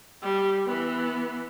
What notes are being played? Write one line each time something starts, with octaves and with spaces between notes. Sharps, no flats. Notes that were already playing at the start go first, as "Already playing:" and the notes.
G3
E3 B3